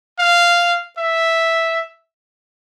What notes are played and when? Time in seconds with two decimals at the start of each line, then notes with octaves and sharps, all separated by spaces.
0.19 F5
0.98 E5